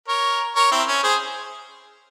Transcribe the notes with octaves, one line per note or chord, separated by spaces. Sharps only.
A#4 C#5
A#4 C#5
C4 E4
C#4
G#4 C5